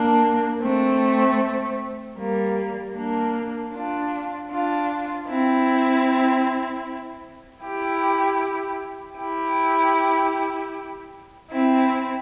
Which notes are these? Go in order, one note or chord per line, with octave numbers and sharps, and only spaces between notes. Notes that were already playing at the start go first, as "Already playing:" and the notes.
Already playing: A#3 D4
A3 C4
G3 A#3
A#3 D4
D4 F4
D4 F4
C4 E4
E4 G4
E4 G4
C4 E4